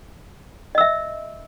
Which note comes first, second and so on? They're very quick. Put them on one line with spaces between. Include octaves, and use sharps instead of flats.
D#5 E6 E5